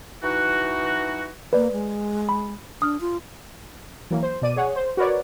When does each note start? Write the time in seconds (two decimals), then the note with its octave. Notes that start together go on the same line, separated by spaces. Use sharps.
0.23 E3 D#4 F#4
1.53 A#3 B4 D5
1.72 G#3
2.29 B5
2.82 D4 D#6 F6
3.01 F4
4.11 E3 F#3 A#3
4.23 C5
4.42 B2 D5 D#7
4.56 G#4 C#5 F#5
4.76 C5
4.97 F#4 A#4 B4 C#5 D5